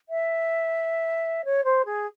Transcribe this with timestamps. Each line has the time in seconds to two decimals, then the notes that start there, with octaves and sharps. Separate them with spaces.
0.09 E5
1.45 C#5
1.64 C5
1.85 G#4